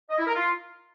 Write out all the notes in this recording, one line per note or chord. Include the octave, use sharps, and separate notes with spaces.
D#5
E4
A#4
F4